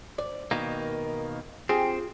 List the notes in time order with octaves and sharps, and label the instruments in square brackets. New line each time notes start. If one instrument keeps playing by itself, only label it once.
[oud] D5
[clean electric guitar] B2 D#3 A#3
[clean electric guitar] C4 [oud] F4 G4 G#4